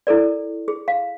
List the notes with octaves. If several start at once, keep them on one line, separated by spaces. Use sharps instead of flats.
E4 A4 A#4 D5
G#4
F5